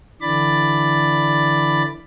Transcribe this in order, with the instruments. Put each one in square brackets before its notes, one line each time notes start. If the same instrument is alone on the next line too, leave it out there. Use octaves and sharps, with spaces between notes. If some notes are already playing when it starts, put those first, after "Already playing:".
[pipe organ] D3 E3 D5 B5 A6